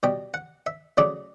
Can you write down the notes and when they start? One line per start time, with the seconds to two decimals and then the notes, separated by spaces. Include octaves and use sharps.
0.03 B2 G3 G5
0.34 F#5
0.66 E5
0.97 C#3 F#3 A3 D5